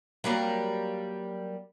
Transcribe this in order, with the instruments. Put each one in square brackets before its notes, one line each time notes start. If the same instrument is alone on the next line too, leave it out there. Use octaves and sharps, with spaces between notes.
[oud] F#3 G3 A#3